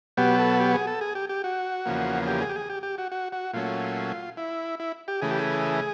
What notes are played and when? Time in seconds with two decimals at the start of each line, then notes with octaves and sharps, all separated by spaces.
0.17 B2 F#3 B3 G4
0.39 A4
0.60 G4
0.73 G#4
0.87 A4
1.01 G#4
1.15 G4
1.29 G4
1.44 F#4
1.86 E2 C#3 F3 A#3
2.27 G4
2.41 G#4
2.49 G4
2.56 G#4
2.70 G4
2.83 G4
2.98 F#4
3.12 F#4
3.32 F#4
3.53 A#2 F#3 A3 C#4 F4
4.37 E4
4.80 E4
5.08 G4
5.21 C#3 E3 A3 G#4
5.31 G4
5.39 G#4